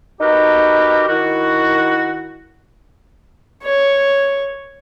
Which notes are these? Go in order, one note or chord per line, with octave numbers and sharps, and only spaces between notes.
D#4 F#4 G4 A#4 B4
D#3 E4 F#4
C#5